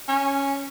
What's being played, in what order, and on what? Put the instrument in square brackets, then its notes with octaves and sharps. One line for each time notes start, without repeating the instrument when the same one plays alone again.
[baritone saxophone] C#4